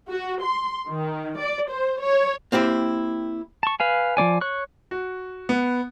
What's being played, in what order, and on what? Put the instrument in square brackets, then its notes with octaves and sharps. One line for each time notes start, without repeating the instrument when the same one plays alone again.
[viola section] F#4
C6
D#3
D5
C5
C#5
[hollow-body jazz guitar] A#3 C4 E4 G4
[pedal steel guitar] A5 C#6
B4 F5 G#5
F3 C4 D5 G#5
C#5 C#6 F#6
[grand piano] F#4
B3